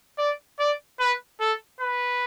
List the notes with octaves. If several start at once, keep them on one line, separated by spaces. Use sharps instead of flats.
D5
D5
B4
A4
B4